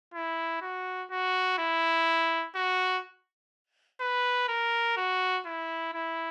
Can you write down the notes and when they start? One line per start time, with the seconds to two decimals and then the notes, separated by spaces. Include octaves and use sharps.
0.14 E4
0.62 F#4
1.10 F#4
1.59 E4
2.56 F#4
4.01 B4
4.49 A#4
4.97 F#4
5.46 E4
5.94 E4